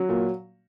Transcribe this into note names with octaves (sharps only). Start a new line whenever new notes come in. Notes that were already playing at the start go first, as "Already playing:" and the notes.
Already playing: F#3
A#2